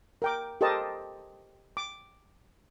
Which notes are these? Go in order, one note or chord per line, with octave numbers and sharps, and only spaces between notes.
A#4 G5 D6
G4 A4 A#4 C5 D#5 A5
D6